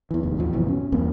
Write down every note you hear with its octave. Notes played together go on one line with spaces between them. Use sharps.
E2 E3
F1 D#2
A1 D#2 F3
F#1 C#2 B2 E3
C#4
E2 G2 A#3 C4